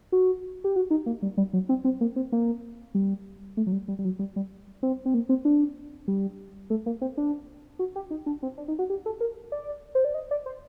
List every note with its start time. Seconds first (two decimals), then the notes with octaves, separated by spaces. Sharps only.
0.12 F#4
0.64 G4
0.76 F#4
0.91 D#4
1.06 A#3
1.22 G3
1.37 G3
1.53 F#3
1.69 C4
1.85 C4
2.01 A#3
2.16 C4
2.32 A#3
2.95 G3
3.57 A3
3.67 F#3
3.72 G3
3.88 G3
3.99 G3
4.05 F#3
4.19 G3
4.36 G3
4.83 C4
5.06 C4
5.14 A#3
5.29 C4
5.45 D4
6.08 G3
6.70 A3
6.86 A#3
7.01 C4
7.17 D4
7.79 F#4
7.96 G4
8.11 D#4
8.26 D4
8.43 C4
8.58 D4
8.68 D#4
8.79 F#4
8.90 G4
9.06 A4
9.20 A#4
9.52 D5
9.95 C5
10.05 D5
10.14 D#5
10.31 D5
10.46 C5